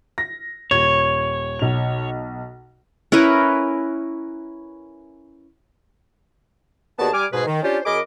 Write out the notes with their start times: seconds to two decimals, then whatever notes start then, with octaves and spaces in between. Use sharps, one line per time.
0.18 A#6
0.71 D#1 C#5 G#6
1.59 B1 F7
3.12 C#4 E4 A#4 B4
6.99 D#2 B3 F#4 G#4 D5 A5
7.14 G3 G#5 D6 F6
7.33 G#2 B2 G#4 B4
7.47 D#3
7.63 C#4 D4 F4 G4 C5
7.86 F#2 G#4 A#4 D#5 B5 D6